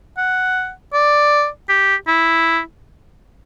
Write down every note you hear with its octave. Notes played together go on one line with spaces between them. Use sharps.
F#5
D5
G4
E4